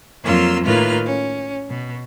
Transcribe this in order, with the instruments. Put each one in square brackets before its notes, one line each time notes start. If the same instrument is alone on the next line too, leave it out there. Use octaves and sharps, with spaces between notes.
[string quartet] F2 F#3 A#3 F4 C6 E6
A2 D#3 A#3 F4 B4 F6
C#4
B2